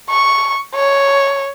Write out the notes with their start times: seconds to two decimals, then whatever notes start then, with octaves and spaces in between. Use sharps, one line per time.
0.10 C#6
0.75 C#5